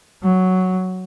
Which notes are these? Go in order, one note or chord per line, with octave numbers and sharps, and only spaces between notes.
F#3